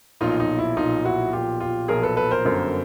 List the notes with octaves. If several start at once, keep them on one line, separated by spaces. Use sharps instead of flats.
B1 A#2 F3 D#4 F4
D#4
E4
B1 A#2 F3 D#4 F4
E4 F#4
B1 A#2 F3 F4 G4
F4 G4
B1 A#2 F3 G#4 A#4
A4 B4
A4 B4
A#4 C5
G1 F#2 D3